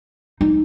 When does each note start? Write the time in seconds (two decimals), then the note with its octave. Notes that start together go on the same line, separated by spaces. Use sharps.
0.41 D#4